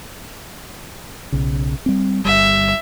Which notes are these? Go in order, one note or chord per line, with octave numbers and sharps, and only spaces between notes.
B1 C#3
G3 C4
G1 G3 E5